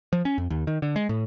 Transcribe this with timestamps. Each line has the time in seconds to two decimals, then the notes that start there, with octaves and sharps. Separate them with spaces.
0.13 F3
0.25 C#4
0.38 F2
0.50 D#2
0.67 D#3
0.82 D3
0.96 G#3
1.09 A2